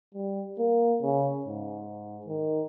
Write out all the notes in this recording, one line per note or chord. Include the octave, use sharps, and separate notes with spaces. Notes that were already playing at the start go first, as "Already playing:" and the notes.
G3
A#3
C#3
G#2
D#3